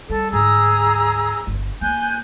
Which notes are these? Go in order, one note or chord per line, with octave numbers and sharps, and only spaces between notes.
G3 A4
D2 G#2 G#4 A#5 E6
G1
A#3 G#5 F#6 G6